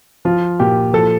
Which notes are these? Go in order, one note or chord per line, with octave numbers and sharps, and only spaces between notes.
F3 F4
A#2 G4
F3 A4